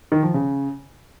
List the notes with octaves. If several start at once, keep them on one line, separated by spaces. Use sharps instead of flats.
D#3
F3
C#3